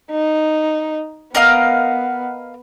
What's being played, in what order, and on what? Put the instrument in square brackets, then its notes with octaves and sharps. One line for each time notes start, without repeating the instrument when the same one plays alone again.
[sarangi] D#4
[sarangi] B3 [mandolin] A#4 D#5 F5